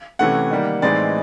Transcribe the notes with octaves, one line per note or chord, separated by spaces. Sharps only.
C3 E3 A3 C#4 F#5
D#3 G3 A#3
A2 E3 G#3 C4 D#4 D5